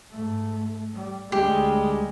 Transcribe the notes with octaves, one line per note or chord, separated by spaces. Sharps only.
G#2 A3
G3
D2 G3 G#3 G4